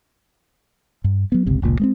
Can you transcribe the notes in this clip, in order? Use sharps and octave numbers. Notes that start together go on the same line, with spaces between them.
G2
F#3 B3
G1 C#2 C3
F1 C#2 A#2
G#3 A#3 C4